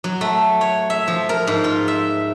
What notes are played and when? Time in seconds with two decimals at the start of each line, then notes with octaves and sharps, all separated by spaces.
0.04 F#3
0.21 A3
0.61 C#5
0.90 E5
1.08 F3
1.29 A#4
1.47 G#2
1.64 F4
1.88 E5